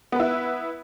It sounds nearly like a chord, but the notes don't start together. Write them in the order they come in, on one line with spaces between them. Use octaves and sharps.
B3 B4 E4